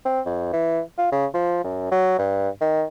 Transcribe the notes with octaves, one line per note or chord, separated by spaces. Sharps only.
C4
F2
E3
F4
C#3
F3
F#2
F#3
G2
D#3